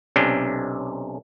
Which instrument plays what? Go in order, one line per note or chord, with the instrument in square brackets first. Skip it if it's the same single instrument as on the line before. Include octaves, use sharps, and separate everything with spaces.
[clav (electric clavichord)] B1 C3 C#4 D4 G5